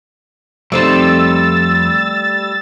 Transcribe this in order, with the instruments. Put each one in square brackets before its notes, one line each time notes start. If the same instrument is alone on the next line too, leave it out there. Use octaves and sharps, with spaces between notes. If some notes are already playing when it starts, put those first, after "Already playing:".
[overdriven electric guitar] F2 C5 [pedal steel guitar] G3 [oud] A3 C4 D#4 [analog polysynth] E6 A6